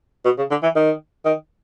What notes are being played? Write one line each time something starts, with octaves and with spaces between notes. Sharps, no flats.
B2
C#3
D3
E3
D#3
D#3